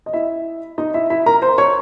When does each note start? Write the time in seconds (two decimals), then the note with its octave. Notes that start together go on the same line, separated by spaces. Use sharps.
0.06 D#5
0.13 E4 E5
0.78 D#4 D#5
0.94 E4 E5
1.10 E4 E5
1.26 A#4 A#5
1.42 C5 C6
1.58 C#5 C#6